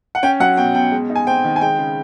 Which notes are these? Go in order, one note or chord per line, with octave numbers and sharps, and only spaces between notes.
F#5
C#4 G5
F#3 F#5
B2 G5
B2 G5
G#3
D#4
G#5
C4 G5
D#3
G#5
G#3 G5
C#3